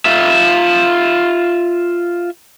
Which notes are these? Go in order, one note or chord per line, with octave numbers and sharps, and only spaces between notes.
F4 E5